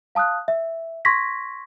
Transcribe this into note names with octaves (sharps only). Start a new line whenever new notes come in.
F5 A5 D#6 F6 F#6
E5
C6 C#6 G#6 A#6 B6